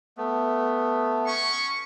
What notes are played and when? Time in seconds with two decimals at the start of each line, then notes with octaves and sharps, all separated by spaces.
0.17 A3 B3
1.26 C#4 C#6